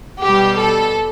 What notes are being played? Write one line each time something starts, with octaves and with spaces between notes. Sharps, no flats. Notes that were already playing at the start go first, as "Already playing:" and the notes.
B2 G3 G4
A4